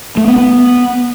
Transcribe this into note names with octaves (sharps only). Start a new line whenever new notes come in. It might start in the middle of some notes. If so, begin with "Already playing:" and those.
A3
B3
B3